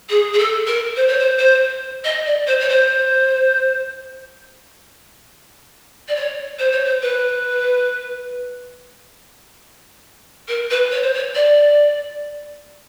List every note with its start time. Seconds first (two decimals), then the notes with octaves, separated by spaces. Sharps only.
0.09 G#4
0.33 G#4
0.38 A4
0.67 A#4
0.96 C5
1.07 C#5
1.19 C5
1.39 C5
2.04 D#5
2.25 D5
2.47 C5
2.60 C#5
2.69 C5
6.08 D5
6.15 C#5
6.58 C5
6.71 C#5
6.84 C5
7.02 B4
10.48 A#4
10.70 B4
10.91 C#5
11.02 C5
11.13 C#5
11.35 D5